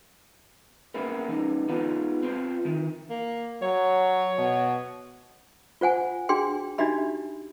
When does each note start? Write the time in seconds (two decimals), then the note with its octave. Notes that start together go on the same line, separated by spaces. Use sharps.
0.94 A#3 B3 C#4 E4 A#4
1.29 E3 C#4 D#4
1.68 B3 D#4 F4 B4
2.23 C4 F4 B4 C5
2.65 D#3 E3
3.10 A#3
3.62 F#3 C#5
4.38 B2
5.81 F4 C5 F#5 G#5
6.29 D4 F#4 G#4 G5 C6
6.78 D4 D#4 F#4 G4 E5 B5